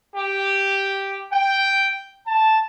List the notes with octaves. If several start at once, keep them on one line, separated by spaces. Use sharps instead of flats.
G4
G5
A5